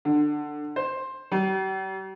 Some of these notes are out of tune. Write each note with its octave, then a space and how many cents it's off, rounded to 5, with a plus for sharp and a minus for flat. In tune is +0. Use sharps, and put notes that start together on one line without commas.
D3 +15
C5 +10
G3 -45